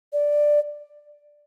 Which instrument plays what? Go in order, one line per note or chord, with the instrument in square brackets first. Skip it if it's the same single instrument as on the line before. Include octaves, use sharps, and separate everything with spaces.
[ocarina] D5